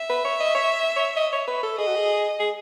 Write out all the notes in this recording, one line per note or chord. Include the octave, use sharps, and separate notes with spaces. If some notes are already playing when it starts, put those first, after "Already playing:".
Already playing: E5
B4
C#5
D#5
C#5
C#5
D#5
C#5
B4
A4
G#4 D#5
F#4
G#4
G#4